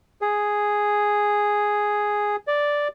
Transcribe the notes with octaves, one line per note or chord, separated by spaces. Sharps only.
G#4
D5